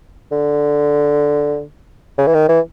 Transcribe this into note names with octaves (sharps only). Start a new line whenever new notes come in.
D3
C#3
E3
D#3
E3